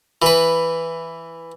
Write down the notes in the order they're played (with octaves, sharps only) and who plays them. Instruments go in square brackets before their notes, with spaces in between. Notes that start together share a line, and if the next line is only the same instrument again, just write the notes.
[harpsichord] E3 B4